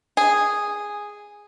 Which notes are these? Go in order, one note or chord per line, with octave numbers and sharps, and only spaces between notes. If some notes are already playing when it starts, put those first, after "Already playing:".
G#4